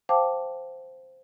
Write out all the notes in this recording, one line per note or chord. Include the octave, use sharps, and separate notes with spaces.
C5 F5 G5 A5 D6